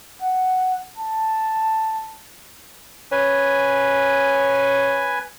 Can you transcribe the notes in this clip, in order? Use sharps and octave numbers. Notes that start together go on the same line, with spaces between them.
F#5
A5
C#4 B4 G#5